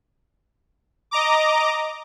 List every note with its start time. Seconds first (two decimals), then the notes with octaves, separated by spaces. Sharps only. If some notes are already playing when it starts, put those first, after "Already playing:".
1.11 D#5 A#5 D6